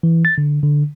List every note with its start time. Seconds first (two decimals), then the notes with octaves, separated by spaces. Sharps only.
0.03 E3
0.25 A6
0.38 D3
0.63 D3